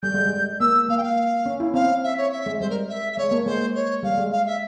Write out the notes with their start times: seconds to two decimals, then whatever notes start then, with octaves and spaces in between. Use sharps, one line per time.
0.02 G3 G6
0.14 G#3
0.25 G3
0.60 A#3 E6
0.89 A#3 F5
0.97 G5
1.03 F5
1.46 C#4
1.60 E4
1.74 C4 F5
2.03 E5
2.17 C#5
2.32 E5
2.46 G#3
2.60 G3 C5
2.70 A#4
2.89 E5
3.12 E5
3.17 G#3 C#5
3.31 A#3
3.46 G#3 C5
3.75 C#5
4.03 G3 F5
4.18 G#3
4.32 F5
4.46 E5